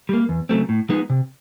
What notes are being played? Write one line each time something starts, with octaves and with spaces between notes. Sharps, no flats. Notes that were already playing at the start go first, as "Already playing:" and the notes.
G3 A#3
E2
C#3 F#3 A3 C4
A2
F3 G#3 B3 D#4
C3